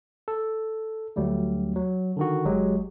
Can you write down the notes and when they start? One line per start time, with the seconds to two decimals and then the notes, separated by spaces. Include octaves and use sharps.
0.28 A4
1.16 D2 F#3 G3 A3
1.76 F#3
2.17 D3 D#3 F#4
2.45 G1 F#3 G#3 G4